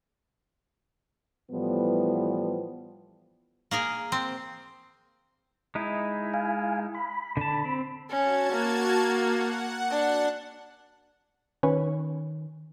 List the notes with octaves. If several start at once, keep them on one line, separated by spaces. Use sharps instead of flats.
A2 E3 F3 G3 B3
A#3 G#4 A#4 G#5
C4
G#3 D#4 E4
F5 G#5
B5
D3 A5
C4
C#4 F#4 A5 G#6
A#3
F#5
D4
D#3 C#4 B4 C#5